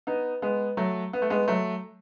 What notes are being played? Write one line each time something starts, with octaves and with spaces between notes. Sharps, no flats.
B3 D#4
G#3 B3
F#3 A3
B3
A3
G#3 B3
F#3 A3